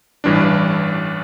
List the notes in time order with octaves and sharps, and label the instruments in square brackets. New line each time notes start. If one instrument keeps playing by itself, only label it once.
[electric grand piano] A1 G2 E3 G3 D4